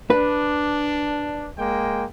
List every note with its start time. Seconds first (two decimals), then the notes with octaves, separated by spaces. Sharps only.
0.10 D4 B4
1.59 G#3 A#3 G5